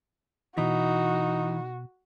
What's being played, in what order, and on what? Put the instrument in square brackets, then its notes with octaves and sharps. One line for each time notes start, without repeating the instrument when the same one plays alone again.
[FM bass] B2 [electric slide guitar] E3 [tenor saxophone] D#4 [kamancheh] F#4